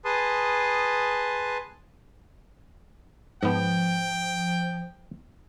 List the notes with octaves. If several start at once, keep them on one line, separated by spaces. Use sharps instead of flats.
G#4 B4 A5 C6 D#6
G#2 F3 B3 G5